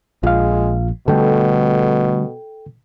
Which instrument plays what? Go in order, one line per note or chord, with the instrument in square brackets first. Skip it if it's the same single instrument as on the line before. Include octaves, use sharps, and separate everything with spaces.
[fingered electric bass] A#1 [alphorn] G#3 [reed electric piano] F4 F5
[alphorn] B2 [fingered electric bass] D3 G3 A3 [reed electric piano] A4 G5